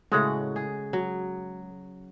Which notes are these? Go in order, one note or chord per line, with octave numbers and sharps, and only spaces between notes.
A2 C#3 G#3 F#4
G#4
F#3